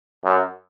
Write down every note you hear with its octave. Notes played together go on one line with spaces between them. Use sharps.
F#2